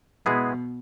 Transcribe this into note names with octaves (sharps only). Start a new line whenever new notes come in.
B2 G#3 B3 E4 G#4